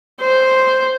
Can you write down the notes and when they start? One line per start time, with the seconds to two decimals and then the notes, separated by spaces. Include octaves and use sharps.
0.22 C5